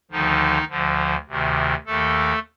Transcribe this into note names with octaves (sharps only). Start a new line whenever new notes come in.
D2 D3 D#3 F3 D#4
D2 D3 F3
D2 C3 D#3
D#2 D#3 A3 A4